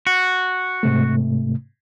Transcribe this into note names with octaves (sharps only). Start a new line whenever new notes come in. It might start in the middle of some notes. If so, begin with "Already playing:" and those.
F#4
G#2 C3 A3